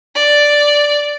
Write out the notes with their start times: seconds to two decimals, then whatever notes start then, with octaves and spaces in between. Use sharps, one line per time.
0.15 D5